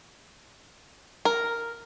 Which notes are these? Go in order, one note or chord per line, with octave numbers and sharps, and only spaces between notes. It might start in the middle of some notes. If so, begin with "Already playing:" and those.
A#4